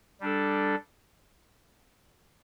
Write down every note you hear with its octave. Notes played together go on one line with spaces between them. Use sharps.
G3 D4 A4